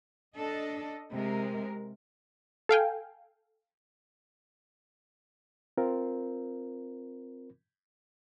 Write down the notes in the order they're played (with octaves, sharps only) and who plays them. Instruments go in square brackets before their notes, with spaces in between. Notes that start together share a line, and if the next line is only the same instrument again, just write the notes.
[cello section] D4 A4 D#5
C3 G#3 A#4
[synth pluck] A4 F5 G5 G#5
[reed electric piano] C4 F4 A#4